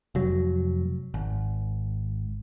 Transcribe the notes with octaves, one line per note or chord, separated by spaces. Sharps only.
F1 F#3
G#1